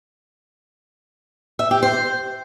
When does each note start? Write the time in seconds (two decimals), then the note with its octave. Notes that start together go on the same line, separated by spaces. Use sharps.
1.59 E5
1.71 G4
1.83 C5